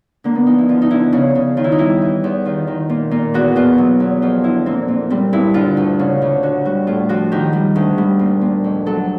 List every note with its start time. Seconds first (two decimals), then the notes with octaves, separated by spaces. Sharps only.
0.24 D3 A#3
0.35 B3
0.47 F3 D#4
0.58 E4
0.69 D3 F4
0.82 D#4
0.90 D3 E4
1.13 C#3
1.35 C#3
1.57 D#3 F4
1.64 E4
1.72 D#4
1.79 G3 E4
2.02 E3
2.24 E2
2.45 D#3 F4
2.68 D#3
2.89 A#2
3.11 A#2
3.34 E2 F#4
3.56 B2 F4
3.78 F#3
4.00 E2
4.22 F2 F4
4.44 D3 E4
4.66 A#2 C4
4.88 A#2
5.10 G3 C4
5.33 G2 E4
5.54 D3 F4
5.77 D2
5.99 C#3
6.22 D2
6.43 D3 F#4
6.65 G3 F#4
6.87 A2 F4
7.09 F3 F#4
7.32 D#3 G4
7.53 G3
7.76 D2
7.98 G3
8.19 A#2
8.41 A#2
8.64 F2
8.86 F#3 A4